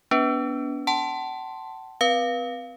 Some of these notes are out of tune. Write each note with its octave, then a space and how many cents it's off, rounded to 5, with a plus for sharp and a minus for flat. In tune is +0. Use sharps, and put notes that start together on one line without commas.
B3 -10 D4 -35 B4 +0
F#5 +45 A5 +0 C6 +0
C4 -25 B4 -30 F5 +0